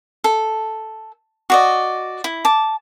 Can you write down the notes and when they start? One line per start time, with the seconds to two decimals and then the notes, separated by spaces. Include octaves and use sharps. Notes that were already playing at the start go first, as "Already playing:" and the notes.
0.24 A4
1.50 F#4 D5 D#5
2.24 E4
2.45 A5 D6